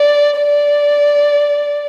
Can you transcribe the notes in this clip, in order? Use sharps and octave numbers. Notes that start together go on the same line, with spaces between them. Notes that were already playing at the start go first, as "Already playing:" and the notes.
Already playing: D5
D5